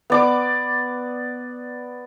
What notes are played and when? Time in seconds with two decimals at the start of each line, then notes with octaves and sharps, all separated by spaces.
0.10 B3 D5 D6